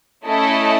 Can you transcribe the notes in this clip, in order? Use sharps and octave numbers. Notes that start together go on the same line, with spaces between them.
A3 C#4 E4 A4 D#5